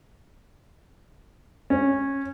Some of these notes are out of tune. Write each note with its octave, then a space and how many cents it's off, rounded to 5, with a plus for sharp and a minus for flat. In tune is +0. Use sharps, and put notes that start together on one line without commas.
C#4 -15